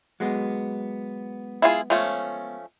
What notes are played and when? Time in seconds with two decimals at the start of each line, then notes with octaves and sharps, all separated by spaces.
0.20 F#3 G#3 B3
1.62 E4 F4 G#4
1.90 F3 A3 C#4